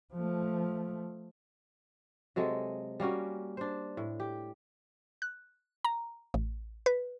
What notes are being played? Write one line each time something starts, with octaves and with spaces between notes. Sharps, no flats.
F3 A3
C3 F#3 G#3 A4
G3 A#3 C#4 F#4
D4 C5
A2
G4
F#6
A#5
A1
B4